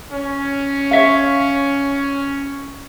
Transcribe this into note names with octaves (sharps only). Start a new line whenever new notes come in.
C#4
C#5 E5 F5